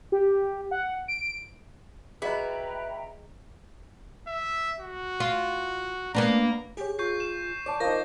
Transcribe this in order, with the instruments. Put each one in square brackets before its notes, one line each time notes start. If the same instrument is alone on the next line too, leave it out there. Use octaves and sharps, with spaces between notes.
[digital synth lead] G4
F#5
D7
[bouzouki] E4 F#4 [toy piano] G#4 D#5 [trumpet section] B4 [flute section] E5 G5 A#5
[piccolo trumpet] E5
F#4
[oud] F4
[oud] A#3 B3 D4 [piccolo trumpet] A#5
[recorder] G4 [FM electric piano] G#4 C#5
[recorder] F4 [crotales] C#6 G6 C7
[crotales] E7
[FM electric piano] C#5 D6 [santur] D5 A5
[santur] F3 D#4 [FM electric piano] A#4 A5 D6 [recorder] C5 [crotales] A#6